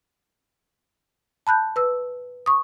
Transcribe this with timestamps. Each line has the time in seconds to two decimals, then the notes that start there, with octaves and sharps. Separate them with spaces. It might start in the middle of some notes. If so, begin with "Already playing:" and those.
1.47 A5 B5 F#6 G6
1.76 B4 E6
2.46 C#6 D#6